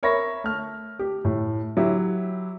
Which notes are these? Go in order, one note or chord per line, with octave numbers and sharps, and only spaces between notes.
A#4 C#5 E5 B5 C#6 A#6
A3 F6
G4
A2
F#3 E4 G4